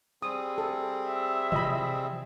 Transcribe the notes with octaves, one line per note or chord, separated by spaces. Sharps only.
G3 C4 G#4 D#6
A4
E5
C3 E3 F3 D#5 B5